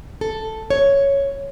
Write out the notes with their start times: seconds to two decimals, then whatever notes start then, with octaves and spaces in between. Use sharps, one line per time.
0.21 A4
0.70 C#5